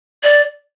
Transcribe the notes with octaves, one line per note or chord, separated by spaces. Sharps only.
D5